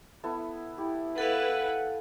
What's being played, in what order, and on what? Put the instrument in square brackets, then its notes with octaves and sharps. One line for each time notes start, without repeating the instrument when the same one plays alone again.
[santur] B3 E4 A4
[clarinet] E4 [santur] G4
[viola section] E4 B4 [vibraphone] A4 F5 [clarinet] F#5